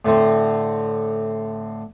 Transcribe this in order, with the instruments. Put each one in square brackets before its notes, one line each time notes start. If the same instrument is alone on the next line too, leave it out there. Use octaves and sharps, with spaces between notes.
[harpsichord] A2 D3 C4